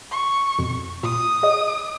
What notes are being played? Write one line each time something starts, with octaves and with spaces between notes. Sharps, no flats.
C#6
F2 B2
A#2 D#6
G#4 C#5 D#5